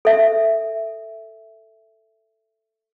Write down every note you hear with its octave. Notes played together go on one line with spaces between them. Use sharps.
A4 E5